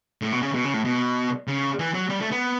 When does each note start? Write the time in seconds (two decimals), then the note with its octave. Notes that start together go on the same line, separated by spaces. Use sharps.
0.22 A2
0.32 B2
0.42 C#3
0.54 B2
0.64 C#3
0.74 A2
0.85 B2
1.48 C#3
1.79 E3
1.94 F#3
2.10 G3
2.20 A3
2.32 B3